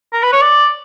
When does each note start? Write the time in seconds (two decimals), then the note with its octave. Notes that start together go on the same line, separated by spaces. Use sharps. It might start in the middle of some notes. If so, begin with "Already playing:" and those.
0.13 A#4
0.23 B4
0.32 C#5
0.42 D5